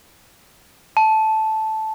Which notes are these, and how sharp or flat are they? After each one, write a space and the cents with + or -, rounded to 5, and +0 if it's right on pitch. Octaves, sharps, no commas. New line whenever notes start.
A5 -10